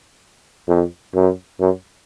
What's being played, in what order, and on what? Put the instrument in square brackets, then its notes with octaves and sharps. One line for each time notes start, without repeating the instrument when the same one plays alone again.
[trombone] F2
F#2
F#2